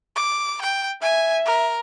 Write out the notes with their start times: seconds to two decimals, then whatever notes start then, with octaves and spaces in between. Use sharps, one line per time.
0.16 D6
0.62 G5
1.02 E5 G#5
1.46 A#4